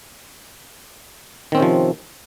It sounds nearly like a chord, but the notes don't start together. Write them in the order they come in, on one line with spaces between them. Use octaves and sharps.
D#3 C4 C#4 C3 F3